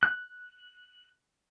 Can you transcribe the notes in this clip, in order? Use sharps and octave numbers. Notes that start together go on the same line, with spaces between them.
F#6